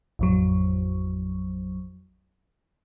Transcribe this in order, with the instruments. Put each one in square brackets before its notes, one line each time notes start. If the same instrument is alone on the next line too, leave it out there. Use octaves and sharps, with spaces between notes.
[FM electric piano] A1 F2 F#3